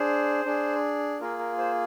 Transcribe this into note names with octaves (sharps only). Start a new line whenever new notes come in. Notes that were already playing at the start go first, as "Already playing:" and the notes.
Already playing: D4 G#4 C5
D4 G#4
A#3 F4 G#4 A#4
A#4
C5